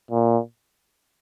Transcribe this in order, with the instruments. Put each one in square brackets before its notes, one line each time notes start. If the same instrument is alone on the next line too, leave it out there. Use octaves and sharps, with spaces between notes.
[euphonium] A#2